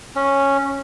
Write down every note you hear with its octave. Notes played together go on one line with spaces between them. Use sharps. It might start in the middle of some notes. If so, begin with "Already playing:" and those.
C#4